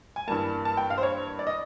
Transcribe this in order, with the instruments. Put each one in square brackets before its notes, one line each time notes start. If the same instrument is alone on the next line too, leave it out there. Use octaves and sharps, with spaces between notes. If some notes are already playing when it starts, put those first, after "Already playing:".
[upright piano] G#5
G2 E3 G3 A#3 A5
A5
G5
F5
C5
C#5
D5
D#5